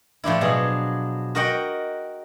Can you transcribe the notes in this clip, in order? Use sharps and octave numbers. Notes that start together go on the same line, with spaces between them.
A2 F3 D4 E4
B2 F3 F#3 G#4
F#4 A#4 D#5 F#5 G5